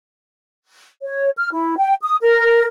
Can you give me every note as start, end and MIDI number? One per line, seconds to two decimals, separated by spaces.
1.02 1.28 73
1.36 1.49 89
1.51 1.75 64
1.78 1.93 79
2.02 2.15 87
2.20 2.65 70